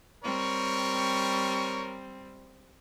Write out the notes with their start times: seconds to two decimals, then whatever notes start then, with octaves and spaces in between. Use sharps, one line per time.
0.23 G3 C4 A#4 C#5 C#6